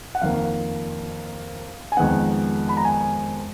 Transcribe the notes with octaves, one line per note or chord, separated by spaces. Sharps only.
F#5
F2 D#3 A#3 F5
G#5
F2 D#3 G#3 B3 F#5
B5
A#5
G#5